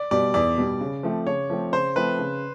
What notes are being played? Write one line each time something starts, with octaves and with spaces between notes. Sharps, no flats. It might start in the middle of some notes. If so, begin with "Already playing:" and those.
Already playing: D5
B2 G3 D5
E2 D5
B2 G3
C#3
F3 A3 C4
C#3 C#5
F3 A3 C4
C#3 C5
F3 A3 C4 B4
C#3